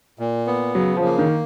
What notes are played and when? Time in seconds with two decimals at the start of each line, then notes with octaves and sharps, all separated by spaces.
0.19 A#2
0.47 B3
0.75 C#3 F#3
0.97 F3
1.04 A#3
1.18 D#3